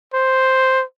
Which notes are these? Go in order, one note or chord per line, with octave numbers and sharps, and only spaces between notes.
C5